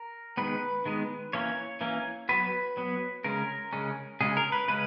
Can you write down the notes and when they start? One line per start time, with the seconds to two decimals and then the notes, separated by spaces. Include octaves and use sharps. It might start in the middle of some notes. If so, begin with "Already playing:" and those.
Already playing: A#4
0.37 D#3 G#3 B3 B4
0.86 D#3 G#3 B3
1.33 E3 A#3 C#4 C#5
1.81 E3 A#3 C#4
2.29 F#3 B3 B4
2.77 F#3 B3
3.24 C#3 G#3 C#4 A#4
3.73 C#3 G#3 C#4
4.21 C#3 G#3 C#4 G#4
4.37 A#4
4.52 B4
4.68 C#3 G#3 C#4 B4